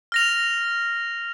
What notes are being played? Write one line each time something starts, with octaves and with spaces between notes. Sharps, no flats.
F6 A#6 F7